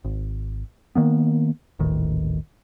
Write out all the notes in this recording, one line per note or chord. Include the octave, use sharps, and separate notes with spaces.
G#1
D#3 A#3 B3
D#1 A1 D#3